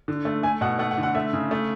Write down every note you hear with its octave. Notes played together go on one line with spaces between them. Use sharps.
D3
A3
A3 G#5
B2 F#5
A3 F#5
F#5
D3
F#5
A3 E5
C#3
A3